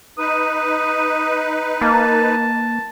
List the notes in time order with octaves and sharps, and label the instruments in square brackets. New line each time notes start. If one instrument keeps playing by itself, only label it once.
[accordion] D#4 B4 [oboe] D#6
[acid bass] A#3 [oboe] A5